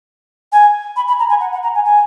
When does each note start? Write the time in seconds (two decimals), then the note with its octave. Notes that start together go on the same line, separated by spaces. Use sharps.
0.52 G#5
0.96 B5
1.08 B5
1.19 A#5
1.29 G#5
1.40 F#5
1.53 F#5
1.63 A#5
1.75 G#5
1.85 G#5